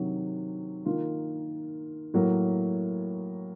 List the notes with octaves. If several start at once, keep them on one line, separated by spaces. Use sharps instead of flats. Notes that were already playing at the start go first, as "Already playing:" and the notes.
Already playing: C3 D#3 F#3
D#3 A#3 F4
A2 F#3 A#3